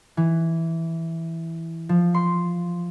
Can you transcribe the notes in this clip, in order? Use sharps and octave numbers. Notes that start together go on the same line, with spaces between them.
E3
F3
C6